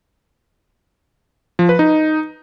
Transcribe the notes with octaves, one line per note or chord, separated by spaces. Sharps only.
F3
B4
D#4